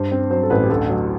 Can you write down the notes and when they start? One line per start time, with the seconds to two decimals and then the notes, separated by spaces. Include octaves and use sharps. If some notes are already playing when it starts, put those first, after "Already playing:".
Already playing: G2 C5
0.12 C4
0.30 F#3 C5
0.43 A4
0.50 A1 B4
0.64 G4
0.70 D2 A4
0.89 F#3